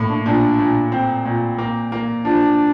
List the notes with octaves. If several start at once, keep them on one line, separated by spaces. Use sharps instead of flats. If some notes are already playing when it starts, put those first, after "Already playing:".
Already playing: A2 A#3
D4
A#2 D4
A#2
C4
A#2
A#3
A#3
F3 D4